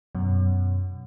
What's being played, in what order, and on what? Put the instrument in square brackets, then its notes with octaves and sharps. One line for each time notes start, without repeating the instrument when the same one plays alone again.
[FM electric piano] F#2 B2